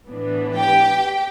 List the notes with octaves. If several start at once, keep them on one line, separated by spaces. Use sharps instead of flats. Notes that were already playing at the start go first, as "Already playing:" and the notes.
A2 E3 B3 D4
G4 G5